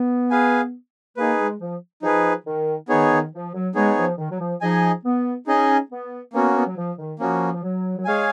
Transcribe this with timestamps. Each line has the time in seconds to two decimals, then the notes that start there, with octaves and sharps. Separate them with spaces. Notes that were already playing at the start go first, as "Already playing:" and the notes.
Already playing: B3
0.30 G#4 B4 F5 G#5
1.17 A#3 D#4 G#4 B4
1.39 G#3
1.60 F3
2.02 F3 D#4 G#4 B4
2.46 D#3
2.89 D#3 B3 D#4 G#4 C#5
3.10 D#3
3.32 F3
3.54 F#3
3.75 G#3 B3 D#4 G#4 C#5
3.97 F3
4.18 D#3
4.30 F#3
4.40 F3
4.61 F3 D#4 G#4 D#5 G#5
5.04 B3
5.47 C#4 D#4 G#4 D#5 G#5
5.90 B3
6.33 A#3 B3 C#4 F#4
6.55 B3
6.67 F#3
6.76 F3
6.98 D#3
7.19 F3 A#3 C#4 F#4
7.53 F3
7.63 F#3
7.97 F#3
8.05 G#3 G#4 C#5 F5 G#5